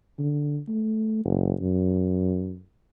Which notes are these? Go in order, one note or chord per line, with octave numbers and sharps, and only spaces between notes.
D3
A3
F#1
F#2